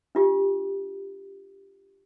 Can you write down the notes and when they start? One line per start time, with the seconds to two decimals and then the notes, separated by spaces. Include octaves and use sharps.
0.15 D4 F4 G4